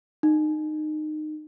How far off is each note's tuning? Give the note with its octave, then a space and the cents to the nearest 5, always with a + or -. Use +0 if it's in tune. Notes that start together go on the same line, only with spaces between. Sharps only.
D#4 -25